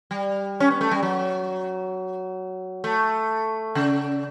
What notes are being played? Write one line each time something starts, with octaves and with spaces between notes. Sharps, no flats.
G3
C#4
B3
A3
G3
F#3
A3
C#3